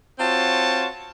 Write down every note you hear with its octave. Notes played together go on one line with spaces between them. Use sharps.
C4 F4 F#4 C#5 A5